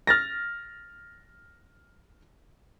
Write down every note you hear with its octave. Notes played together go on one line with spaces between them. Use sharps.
F6 A6 A#6